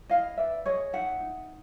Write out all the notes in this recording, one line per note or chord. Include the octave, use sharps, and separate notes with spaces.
E4 D#5 F5
B4 D5 E5
G#4 C#5 D#5
D#4 E5 F#5
D#4